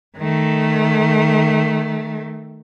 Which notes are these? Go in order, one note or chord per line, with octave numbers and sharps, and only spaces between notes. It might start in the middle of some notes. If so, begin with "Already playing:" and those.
D#3 A3